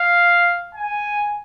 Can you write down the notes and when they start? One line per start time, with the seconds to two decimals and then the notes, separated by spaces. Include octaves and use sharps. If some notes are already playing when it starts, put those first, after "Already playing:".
Already playing: F5
0.75 G#5